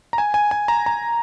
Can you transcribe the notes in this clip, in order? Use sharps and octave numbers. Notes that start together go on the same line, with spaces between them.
A#5
G#5
G#5
G#5
A#5
A#5